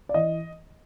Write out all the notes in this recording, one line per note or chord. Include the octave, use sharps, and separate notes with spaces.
D5
E3 D#5